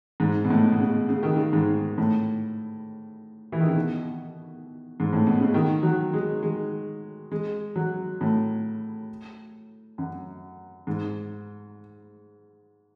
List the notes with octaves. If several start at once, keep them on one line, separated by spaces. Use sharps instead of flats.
G#2
B2
A2
B2
C#3
C#3
D#3
C#3
G#2
A2
E3
D#3
C#3
B2
G#2
A2
B2
C#3
D#3
F#3
G#3
G#3
G#3
F#3
A2
F#2
G#2